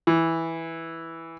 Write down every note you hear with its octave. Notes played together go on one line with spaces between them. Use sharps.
E3